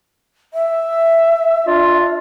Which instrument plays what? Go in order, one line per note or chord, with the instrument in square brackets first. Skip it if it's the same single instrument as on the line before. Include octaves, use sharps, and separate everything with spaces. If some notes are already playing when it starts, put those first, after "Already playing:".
[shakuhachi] E5
[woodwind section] D4 F4